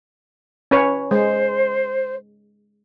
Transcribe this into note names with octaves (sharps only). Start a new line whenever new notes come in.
C#4 B4 C#5
G#3 C5